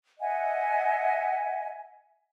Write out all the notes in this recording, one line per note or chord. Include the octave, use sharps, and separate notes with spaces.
D#5 E5 F#5 G#5